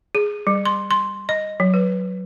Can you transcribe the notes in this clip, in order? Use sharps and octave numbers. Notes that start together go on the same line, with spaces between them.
G#4
G3
C6
C6
D#5
F#3
B4